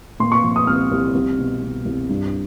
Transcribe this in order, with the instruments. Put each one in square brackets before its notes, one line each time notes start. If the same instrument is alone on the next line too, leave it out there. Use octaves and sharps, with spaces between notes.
[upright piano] A#2 C6
C#6
F3
D#6
C2 F6
C2
C2
B2
B2
C2
G2